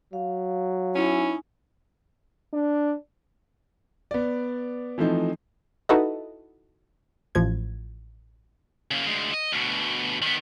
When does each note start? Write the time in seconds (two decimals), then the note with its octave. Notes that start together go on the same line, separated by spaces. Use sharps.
0.13 F#3 F5
0.95 C#4 D#4 E4 G#5
2.53 D4
4.11 B3 D5
4.98 E3 F3 A3 C4 D#4
5.89 D#4 E4 F#4 A4 B4 D#5
7.35 A1 F3 G#6
8.91 C#3 A#3
9.07 D2 G#3
9.33 D#5
9.52 D2 B2
10.22 D#3 B3